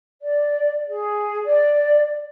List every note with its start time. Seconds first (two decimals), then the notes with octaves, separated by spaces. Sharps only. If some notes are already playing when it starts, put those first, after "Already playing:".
0.21 D5
0.89 G#4
1.45 D5